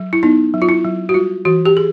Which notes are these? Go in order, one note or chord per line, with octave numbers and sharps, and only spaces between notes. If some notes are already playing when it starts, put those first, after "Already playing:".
Already playing: F#3
E4
B3 D#4
F#3
F4
E4
F#3
F#4
G3 F4
E3 F#4
G4
G#4